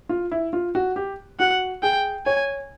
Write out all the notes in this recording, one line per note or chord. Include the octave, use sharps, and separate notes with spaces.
F4
E4
F4
F#4
G4
F#4 F#5
G#4 G5
C#5 G#5